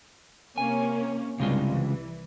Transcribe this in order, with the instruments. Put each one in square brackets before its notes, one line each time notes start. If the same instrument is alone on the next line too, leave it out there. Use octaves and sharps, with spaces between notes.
[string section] C3 A#3 C#4 [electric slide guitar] G#5
[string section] C2 G2 [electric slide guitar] C#3 G#3 F4
[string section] E3